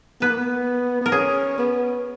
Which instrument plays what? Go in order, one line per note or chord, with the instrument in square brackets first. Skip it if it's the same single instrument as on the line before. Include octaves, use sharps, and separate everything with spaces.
[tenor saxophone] B3 [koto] B4
[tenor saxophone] A#3
B3
[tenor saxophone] B3 [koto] A#4
[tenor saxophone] C#4 [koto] G#4
[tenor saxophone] B3